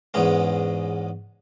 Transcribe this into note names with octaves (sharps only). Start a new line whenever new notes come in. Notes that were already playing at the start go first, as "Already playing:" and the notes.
E2 G#2 G#3 B3 C#4